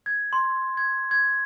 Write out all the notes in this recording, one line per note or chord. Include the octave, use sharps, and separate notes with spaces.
G#6
C6
G#6
G#6